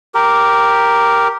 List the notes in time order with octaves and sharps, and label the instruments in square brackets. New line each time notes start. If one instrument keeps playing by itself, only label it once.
[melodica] G4 A#4